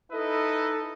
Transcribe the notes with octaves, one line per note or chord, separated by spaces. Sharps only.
D#4 E4 A4 B4 D#5